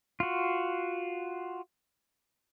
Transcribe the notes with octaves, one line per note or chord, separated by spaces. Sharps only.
F4 F#4